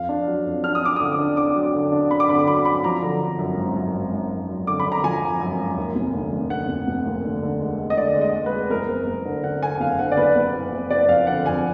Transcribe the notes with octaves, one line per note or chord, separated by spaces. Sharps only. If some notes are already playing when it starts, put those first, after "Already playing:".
Already playing: F2 F5
D4
F#3
F2
D4 F6
D#6
D4 D6
D3 D#6
D4
D4 D6
F#3
D3
D4
D4 B5
D6
D3 B5
D6
F#3 B5
D6
F#3 B5
F3 A#5
D3
D3
F#2
G#1
F#2
G#1
G#1
F#2
F#2
D3 D6
B5
D3
A#5
F3 G#5
F3
F#2
G#1
D#2
F1
D3
F1
D3 F#5
F1
F1
D#2
D3
D3
G#3
G#3
D#5
D3 D5
G#3
D#5
G#3
B4
G#3
F#1 A#4
F#1
F#1
D3
D3 F#5
D3 G#5
F#1 F5
D3 F#5
D5
F#1 B4
F#1
F#1
F#1
F#1 D5
F2 F5
D3 F#5
F2 G#5